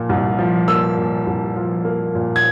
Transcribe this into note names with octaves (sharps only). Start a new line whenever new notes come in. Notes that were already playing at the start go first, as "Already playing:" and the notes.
Already playing: A#2 F3 A#3
C2
F3
A#3 E6
A#2
C2
F3
A#3
A#2
G#6